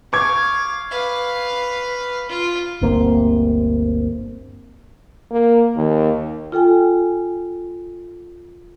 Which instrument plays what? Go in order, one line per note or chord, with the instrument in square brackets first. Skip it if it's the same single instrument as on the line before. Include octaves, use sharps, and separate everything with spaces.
[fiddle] F5 [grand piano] C#6 D6 G#6
[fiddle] B4 F5
F4
[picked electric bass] G1 D2 A#3 C4
[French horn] A#3
D#2
[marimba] F4 A4 G5 G#5